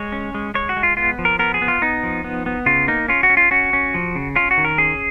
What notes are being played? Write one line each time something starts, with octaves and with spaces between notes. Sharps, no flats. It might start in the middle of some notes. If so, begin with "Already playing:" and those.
Already playing: G#3 C#5
C#4
G#3
G#3 C#5
F#4
G#3
F4
B3 F4
F3
A#4
B3 A#4
G#4
B3
F4
B3 D#4
F3
B3
B3
C#3 F4
A#3 D#4
C#4 F4
F#4
C#4
F4
C#4 F#4
C#4
F3
C#3
C#4 F4
F#4
D#3
A#4
C#4 G#4